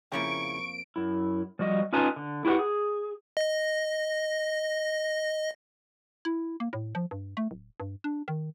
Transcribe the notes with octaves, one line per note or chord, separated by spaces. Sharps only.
F2 C#3 F3 A#3 C#4 E4 C#6 D7
F#2 E4
F3 G3 F#4 D#5
C#4 D#4 F4 B4 G#5 A5
D3
E4 F#4 G4 B4 F#5
G#4
D#5 A#6
E4
A#3
A2
F3
G2
A3
D1
G2
D4
D#3